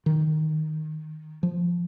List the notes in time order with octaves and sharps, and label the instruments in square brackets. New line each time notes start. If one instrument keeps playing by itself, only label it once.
[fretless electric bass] D#3
F3